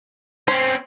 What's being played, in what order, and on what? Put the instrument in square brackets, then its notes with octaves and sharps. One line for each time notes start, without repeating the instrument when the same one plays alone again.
[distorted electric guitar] C4 C#4 [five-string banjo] C5